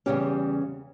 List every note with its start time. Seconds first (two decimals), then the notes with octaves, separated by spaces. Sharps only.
0.06 E2 C#3 G3 C#4 G4